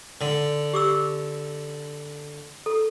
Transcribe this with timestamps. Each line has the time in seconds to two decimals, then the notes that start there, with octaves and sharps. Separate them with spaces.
0.21 D3
0.74 G4 D6 E6
2.66 A4